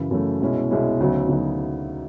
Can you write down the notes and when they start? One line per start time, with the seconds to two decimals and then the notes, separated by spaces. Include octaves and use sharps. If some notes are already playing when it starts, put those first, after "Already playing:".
Already playing: F#2 C#3 E3
0.11 F#2 C#3 E3 A3
0.40 C2 B2 G#3 C#4 E4
0.70 C2 B2 G#3 C#4 E4
1.00 D2 C#3 F#3 B3 D#4
1.29 D2 C#3 F#3 B3 D#4